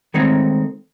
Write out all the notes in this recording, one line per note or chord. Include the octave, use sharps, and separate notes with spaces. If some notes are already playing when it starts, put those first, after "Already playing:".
D#3 G#3 A3 C4 D#4 C#5